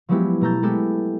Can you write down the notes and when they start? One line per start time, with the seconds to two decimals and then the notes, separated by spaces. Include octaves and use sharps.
0.09 F3 F#3 G#3 B3 E4 G4
0.41 B2 A3 A#5 E6 G6 A6
0.62 G#3 A3 B3 E4 G4 A4